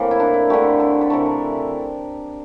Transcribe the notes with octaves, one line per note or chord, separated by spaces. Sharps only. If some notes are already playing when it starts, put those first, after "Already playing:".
Already playing: A2 E3 A#3 C4
E4
D4
E4
D3 A3 G4
A4
A4
C3 E3 A3 A#4
A#4